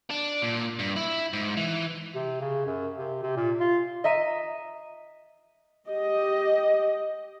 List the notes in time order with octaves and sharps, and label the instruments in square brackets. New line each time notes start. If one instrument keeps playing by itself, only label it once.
[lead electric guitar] D4
A#2
G2
E4
G#2
E3
[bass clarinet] C3
C#3
F#2
C3
C3
A#2
F4
[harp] D#5 E5 A#5 D#7
[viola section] G4 D#5